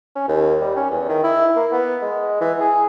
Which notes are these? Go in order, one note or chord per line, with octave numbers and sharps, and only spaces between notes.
C#4
D#2
G3
C#4
E2
D#3
E4
A#3
B3
G#3
E3
G#4